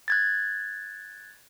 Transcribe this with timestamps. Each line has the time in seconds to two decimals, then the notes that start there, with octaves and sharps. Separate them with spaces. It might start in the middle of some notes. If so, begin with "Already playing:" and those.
0.08 F#6 G#6 A6